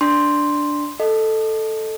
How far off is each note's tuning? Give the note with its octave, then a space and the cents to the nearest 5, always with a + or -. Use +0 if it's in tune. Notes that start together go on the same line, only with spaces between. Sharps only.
D4 +0 C6 +0
A4 +0 D#5 +0